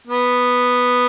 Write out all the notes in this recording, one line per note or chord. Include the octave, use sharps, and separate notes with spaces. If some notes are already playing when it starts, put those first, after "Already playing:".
B3